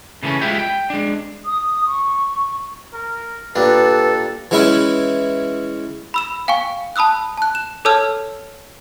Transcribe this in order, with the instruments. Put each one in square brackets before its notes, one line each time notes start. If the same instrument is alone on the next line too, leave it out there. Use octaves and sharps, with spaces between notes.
[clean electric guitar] C#3 E3 G3 A3 C#4
G#3 E4 F4 G4 E5 G5
G5
G#3 D4
[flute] D#6
C#6
[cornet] A#4
[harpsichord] A#2 G3 D4 [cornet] A4 [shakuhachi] B4
[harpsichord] E3 G#3 C#4 E4 B4
[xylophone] B5 E6 E7
F5 G5 G#5 C#6
A5 B5 D#6 E6 F#6
A5 F#6
E7
A4 C#5 A5 E6 F6 G#6